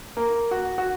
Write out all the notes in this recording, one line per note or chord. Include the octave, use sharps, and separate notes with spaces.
A#3
F#4
F#4